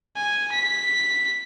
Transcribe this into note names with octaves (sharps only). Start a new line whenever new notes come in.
G#5
B6